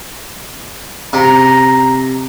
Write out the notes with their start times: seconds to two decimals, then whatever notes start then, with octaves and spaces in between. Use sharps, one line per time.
1.13 C3 A#5